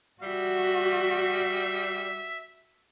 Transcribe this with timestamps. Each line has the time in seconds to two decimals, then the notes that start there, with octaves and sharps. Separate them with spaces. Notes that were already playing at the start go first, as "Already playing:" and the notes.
0.22 G3 F#4 E5